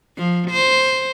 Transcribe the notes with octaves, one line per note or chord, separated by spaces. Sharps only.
F3
C5